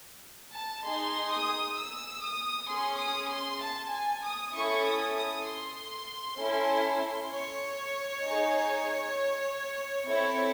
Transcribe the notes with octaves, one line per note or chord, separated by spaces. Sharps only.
A5
D#4 G#4 C6
D#6
E6
D#6
C#4 G#4 C6
D#6
C6
A5
G#5
D#6
C#4 E4 A4 C#6
D#6
D#6
C6
C#4 E4 A4
C#5
D#4 G#4
C4 E4 A4 C#5